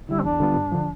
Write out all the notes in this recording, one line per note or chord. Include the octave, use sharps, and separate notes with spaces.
D3 G3 E4
C4
E2 D4
D3 G3 B3 F4
G2
D3 F3